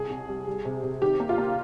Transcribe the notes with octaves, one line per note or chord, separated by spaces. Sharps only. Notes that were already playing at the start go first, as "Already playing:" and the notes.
Already playing: C2 G3 G#4
C2
G3
G3
C3
C3
D#3 G4
A#3
F4
A#3